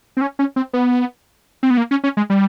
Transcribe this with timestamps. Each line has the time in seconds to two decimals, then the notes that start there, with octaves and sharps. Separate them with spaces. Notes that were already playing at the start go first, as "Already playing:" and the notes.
0.17 C4
0.21 C#4
0.39 C#4
0.56 C4
0.73 B3
1.63 C4
1.71 B3
1.77 A#3
1.91 C#4
2.04 C#4
2.17 G#3
2.30 G3